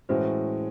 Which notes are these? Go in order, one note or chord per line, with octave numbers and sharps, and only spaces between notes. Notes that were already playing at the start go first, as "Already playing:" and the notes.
A2 E3 G#3 C#4 F#4 C5